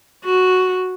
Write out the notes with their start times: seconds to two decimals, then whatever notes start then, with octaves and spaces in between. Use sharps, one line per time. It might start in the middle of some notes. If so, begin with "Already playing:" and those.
0.25 F#4